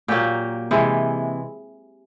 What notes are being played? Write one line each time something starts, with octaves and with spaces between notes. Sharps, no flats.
A#2 F#3 A#3 G4
C3 E3 G#3